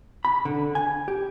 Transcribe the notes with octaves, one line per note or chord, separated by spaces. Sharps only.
B5
D3
G#5
G4